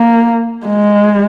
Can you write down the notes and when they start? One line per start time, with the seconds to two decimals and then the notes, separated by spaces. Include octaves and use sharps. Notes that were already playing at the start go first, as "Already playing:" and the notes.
Already playing: A#3
0.66 G#3